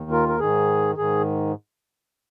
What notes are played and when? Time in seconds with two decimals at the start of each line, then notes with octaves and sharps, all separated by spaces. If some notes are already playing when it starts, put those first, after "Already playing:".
Already playing: D#2 D#3
0.11 F4 A#4
0.29 A#4
0.40 G#2 D#3 G#4
0.97 G#2 D#3 G#4